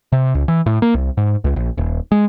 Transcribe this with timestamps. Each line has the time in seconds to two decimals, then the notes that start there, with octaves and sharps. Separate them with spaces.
0.12 C3
0.35 C#2
0.48 E3
0.66 A2
0.82 A#3
0.94 C2
1.17 G#2
1.44 C#2
1.56 A#1
1.78 D#1
2.12 G#3